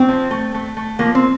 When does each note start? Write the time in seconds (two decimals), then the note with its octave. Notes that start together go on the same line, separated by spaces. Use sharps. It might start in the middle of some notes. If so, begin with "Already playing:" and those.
Already playing: C4
0.08 F3
0.31 A3
0.54 A3
0.77 A3
0.99 F3 A#3
1.15 C4